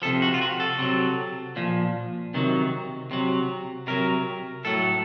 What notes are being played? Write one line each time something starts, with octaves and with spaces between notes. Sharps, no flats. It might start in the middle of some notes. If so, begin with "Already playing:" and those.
C3 F3 A4
F#4
F4
F#4
A4
C3 F#3
A#2 F3
C3 D#3 F#3
C3 F#3
C3 F#3 A#4
A2 F#3 A4